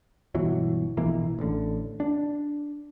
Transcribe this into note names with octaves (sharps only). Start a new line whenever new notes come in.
G1 B2 E3 F#3
A#1 B2 E3 A#3
A1 D3
D4